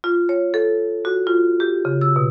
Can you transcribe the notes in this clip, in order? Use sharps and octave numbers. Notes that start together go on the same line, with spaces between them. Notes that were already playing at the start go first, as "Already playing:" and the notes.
F4
C#5
A4
F#4
F4
G4
C#3
E6
B2